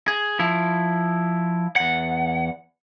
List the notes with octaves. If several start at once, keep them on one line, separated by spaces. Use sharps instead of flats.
G#4
F3 E4
E2 F#5